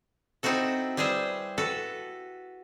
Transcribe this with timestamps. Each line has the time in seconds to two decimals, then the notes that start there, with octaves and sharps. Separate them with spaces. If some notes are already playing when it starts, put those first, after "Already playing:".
0.43 C4 D#4 E4 F#4 A4
0.97 G3 E4 G#4 B4 C5
1.58 F#4 A4 B4